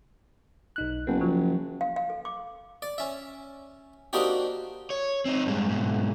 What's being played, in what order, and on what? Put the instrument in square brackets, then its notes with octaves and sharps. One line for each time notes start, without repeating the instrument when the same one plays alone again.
[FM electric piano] B1 D#4 F#6
[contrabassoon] F#1 [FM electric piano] B3
[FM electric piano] F3
[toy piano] F5
F5
A4
D6
[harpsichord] D5
C#4 E5
A#3 C4 D4 D#4 F#4 G4
[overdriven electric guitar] C#5
C4 D#4
G2 G#3
G#2 B2